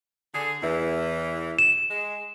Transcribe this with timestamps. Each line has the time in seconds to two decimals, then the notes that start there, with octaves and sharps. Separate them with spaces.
0.34 D3 G#4
0.61 E2 E3
1.59 E7
1.89 G#3